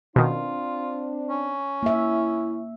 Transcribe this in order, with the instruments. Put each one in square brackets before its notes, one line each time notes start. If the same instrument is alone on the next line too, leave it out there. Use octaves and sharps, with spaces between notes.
[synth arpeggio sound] B2 D#3 [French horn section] C4 D4 [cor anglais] F4
[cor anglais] C#4
[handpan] A#3 E5 [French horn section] E4